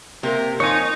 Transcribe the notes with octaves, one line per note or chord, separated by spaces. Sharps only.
C3 A#3 A#4
F2 D#4 C#5 G#5